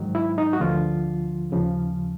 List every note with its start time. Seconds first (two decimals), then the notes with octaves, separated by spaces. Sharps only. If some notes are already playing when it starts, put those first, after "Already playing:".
Already playing: G#2 D#3 F#3
0.15 E4
0.38 D#4
0.53 F#4
0.60 D2 D3 F3 F4
1.50 D#2 C#3 F3